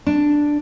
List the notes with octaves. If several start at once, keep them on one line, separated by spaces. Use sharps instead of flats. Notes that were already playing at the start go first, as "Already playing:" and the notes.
D4